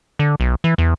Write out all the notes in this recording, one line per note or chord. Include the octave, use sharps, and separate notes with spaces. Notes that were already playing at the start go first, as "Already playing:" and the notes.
D3
B1
E3
E2